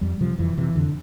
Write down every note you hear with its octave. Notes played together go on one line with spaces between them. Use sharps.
F2 G3
C3 F3
F2 E3
C3 E3
F2 D3